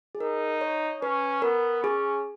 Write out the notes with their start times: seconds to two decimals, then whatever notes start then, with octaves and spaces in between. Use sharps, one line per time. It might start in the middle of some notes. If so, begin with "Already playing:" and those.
0.15 G#4
0.20 D#4 A#4
0.61 C#5
1.02 C#4 B4
1.42 B3 A#4
1.83 C#4 G#4